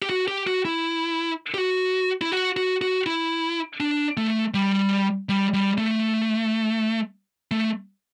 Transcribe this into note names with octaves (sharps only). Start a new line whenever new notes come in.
G4
F#4
G4
F#4
E4
G4
F#4
E4
F#4
F#4
F#4
E4
D4
A3
G3
G3
G3
A3
A3